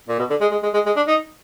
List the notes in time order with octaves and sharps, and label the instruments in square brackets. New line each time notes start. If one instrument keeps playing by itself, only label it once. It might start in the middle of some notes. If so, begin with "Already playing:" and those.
[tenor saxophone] A#2
B2
D3
G#3
G#3
G#3
G#3
G#3
D4
D#4